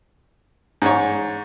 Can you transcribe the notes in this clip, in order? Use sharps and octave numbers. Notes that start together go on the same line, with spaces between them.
G#2 C#5